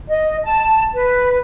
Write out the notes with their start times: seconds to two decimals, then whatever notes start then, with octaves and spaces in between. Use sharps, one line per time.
0.08 D#5
0.44 A5
0.94 B4